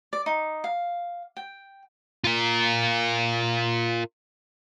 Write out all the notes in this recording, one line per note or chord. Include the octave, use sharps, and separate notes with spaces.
D5
D#4
F5
G5
F4 A#4